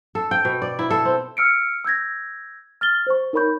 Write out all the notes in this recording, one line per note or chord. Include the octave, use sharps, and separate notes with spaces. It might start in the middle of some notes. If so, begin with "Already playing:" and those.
A4
G5
B2
D5
E4
A4
C4
E6 F6 C#7 D7
E6 G6 G#6 A#6
F6 A6 G7
C5 C#6
D#4 A#4 C#5 B5 C#6 G6